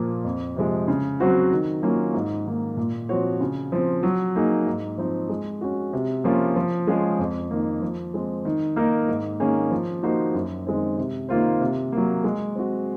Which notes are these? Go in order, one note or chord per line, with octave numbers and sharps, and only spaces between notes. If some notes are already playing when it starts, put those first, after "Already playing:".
Already playing: A#2 F3 A#3
F2
C3 F3 G#3
C#3
F#3 C4 F#4 C5
D#3
F#3 A#3 C#4 F4
G#2
D#3 A#3
A#2
F3 C4 F#4 C#5
C#3
F3 C4
F#3
A#3 D#4 G#4
G#2
F3 C4 D#4
G#3
C#4 F#4
C3
F3 A#3 C#4 F4
F3
G#3 C#4 F4 G#4
F2
D#3 A#3
F3
G#3 C4
D#3
A#3 D#4 A#4
G#2
D#3 A#3 C#4 G#4
F3
A#3 D#4 F#4 C5
F#2
D#3 G#3 C4
C3
D#3 A#3 F4 C5
C3
F#3 A#3
G#3
C4 F#4